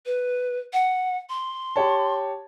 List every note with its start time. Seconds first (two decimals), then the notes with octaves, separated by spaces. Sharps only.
0.06 B4
0.73 F#5
1.29 C6
1.76 G4 C#5 A5